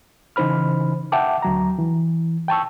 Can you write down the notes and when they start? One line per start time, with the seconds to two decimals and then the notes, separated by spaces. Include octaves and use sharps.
0.36 C#3 E3 D#4 C5 B5 F6
1.12 E5 F#5 G5 A5 D6
1.42 D2 F#3 A#5
1.78 E3
2.48 G5 A5 C#6 E6